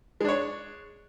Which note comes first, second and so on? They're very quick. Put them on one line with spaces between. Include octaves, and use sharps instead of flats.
G#3 D4 C#5